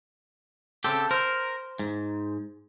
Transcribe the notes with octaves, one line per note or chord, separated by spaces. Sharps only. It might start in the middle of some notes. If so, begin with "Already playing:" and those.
C#3 C4 G4 A4
A#4 C5
G#2